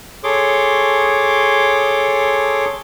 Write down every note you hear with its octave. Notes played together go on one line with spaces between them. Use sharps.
G#4 A4 C#5 C6 D6